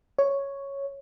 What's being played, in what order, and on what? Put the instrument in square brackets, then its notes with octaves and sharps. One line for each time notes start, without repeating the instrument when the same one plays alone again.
[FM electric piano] C#5